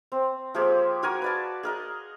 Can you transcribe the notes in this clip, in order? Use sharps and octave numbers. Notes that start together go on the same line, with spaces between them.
C4
F3 A#3 G4 G#4
F#4 A#4 G#5 C#6
B4 D5 A5
G#4 A#4 D#5